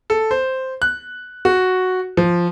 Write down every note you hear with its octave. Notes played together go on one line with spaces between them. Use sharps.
A4
C5
F#6
F#4
F3